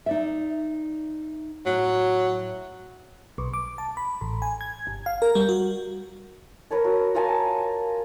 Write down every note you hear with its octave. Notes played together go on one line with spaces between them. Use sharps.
D#4 D5 E5
A2 F#3
B1
D6
A5
B5
A1
G#5
G#6
G1
F5
A#4
G3
F#4
A#4 B4 C#5 A5
F#4
F4 A#4 G#5 A5